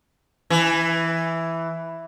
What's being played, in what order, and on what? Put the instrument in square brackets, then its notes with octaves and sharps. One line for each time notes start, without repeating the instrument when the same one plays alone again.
[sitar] E3